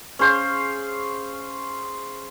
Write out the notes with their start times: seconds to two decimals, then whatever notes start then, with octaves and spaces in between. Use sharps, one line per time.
0.19 C#4 G#4 C5 F5